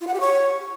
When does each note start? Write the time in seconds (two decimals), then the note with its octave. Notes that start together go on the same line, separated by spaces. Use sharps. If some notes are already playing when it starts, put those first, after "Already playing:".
0.01 F4
0.07 F#5
0.14 G4
0.20 C#5